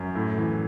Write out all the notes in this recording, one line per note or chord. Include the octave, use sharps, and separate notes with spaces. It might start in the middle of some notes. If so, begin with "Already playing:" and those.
Already playing: F#2
A2
E3